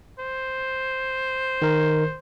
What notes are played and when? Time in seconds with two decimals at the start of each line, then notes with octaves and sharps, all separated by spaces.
0.19 C5
1.62 D#3 A#4